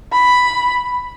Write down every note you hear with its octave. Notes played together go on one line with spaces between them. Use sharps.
B5